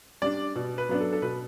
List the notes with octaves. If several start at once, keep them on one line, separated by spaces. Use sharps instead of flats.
G3 D4 D5
B2
B4
F#3 B3 D4
A4
A4
B2 B4